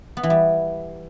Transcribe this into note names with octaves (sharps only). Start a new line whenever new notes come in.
B3
E3
G3